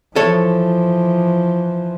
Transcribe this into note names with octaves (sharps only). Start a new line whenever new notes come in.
E3 F3 A4 C#5